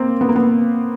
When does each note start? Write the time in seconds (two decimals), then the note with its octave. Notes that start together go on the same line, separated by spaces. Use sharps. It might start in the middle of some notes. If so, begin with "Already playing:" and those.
Already playing: A#3 C4
0.21 B3
0.29 A#3
0.36 B3